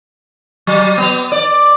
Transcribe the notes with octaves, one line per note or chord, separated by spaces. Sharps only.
F#3
B3
D5